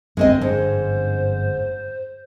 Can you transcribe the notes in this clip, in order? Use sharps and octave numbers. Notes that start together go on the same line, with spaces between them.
G1 F2 G#3 C4 D4 D#5
G#2 C5